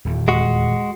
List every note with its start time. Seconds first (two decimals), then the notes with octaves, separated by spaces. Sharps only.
0.05 D#1 E2
0.28 G#3 F#4